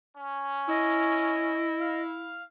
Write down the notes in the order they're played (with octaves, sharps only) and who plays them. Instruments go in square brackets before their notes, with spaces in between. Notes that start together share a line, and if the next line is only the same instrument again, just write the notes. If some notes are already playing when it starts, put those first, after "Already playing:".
[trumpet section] C#4
[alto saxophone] E4 [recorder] D#5
[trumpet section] F5